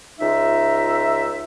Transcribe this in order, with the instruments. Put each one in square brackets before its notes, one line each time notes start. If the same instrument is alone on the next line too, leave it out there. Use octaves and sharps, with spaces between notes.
[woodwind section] C#2 D#4 F4 E5